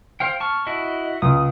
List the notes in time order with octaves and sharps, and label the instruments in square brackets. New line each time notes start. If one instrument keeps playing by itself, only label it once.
[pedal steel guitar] C5 F5 G5
A5 C#6 F6
E4 F#4 D#5
[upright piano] C#2 [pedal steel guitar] D#6